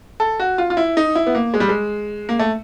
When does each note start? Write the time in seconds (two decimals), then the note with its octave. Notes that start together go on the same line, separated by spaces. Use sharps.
0.20 A4
0.40 F#4
0.58 F4
0.70 F4
0.77 E4
0.97 D#4
1.15 E4
1.27 B3
1.35 A#3
1.54 G#3
1.60 G3
1.68 G#3
2.29 A#3
2.39 A3